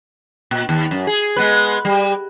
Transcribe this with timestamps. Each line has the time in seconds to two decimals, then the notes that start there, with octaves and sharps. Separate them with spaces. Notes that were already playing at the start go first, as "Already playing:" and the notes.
0.51 A#2
0.69 D#2
0.91 F#2
1.07 G#4
1.36 G#3 B3 B4
1.85 G3